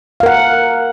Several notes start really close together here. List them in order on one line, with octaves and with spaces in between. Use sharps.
F5 A#4 F#5